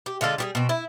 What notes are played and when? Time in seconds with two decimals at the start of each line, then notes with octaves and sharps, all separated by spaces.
0.06 G4
0.21 D3 G#3 F4 A4
0.38 G3 G4 G#4
0.55 B2 C4
0.69 E4